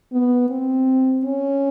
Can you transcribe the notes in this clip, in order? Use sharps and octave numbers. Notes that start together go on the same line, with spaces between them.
B3
C4
C#4